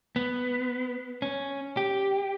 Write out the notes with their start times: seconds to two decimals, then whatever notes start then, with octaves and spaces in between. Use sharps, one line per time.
0.16 B3
1.22 C#4
1.77 G4